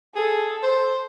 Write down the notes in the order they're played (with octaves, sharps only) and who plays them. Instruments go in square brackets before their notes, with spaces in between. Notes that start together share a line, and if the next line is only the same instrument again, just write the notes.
[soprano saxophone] G#4 [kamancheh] A4
[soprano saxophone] C5